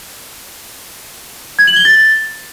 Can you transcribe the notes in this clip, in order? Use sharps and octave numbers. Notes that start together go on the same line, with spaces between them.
G#6
F#7
G7
A6